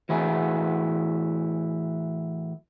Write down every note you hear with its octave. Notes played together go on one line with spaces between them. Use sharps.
A2 E3 E4 F#4 G#4